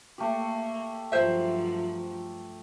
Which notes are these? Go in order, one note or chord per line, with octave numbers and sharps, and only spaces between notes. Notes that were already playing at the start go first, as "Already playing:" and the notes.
A3 A#3 G4
G2 F3 F#3 C5 E5